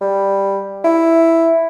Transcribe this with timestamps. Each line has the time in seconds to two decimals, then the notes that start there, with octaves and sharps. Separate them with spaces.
0.01 G3
0.84 E4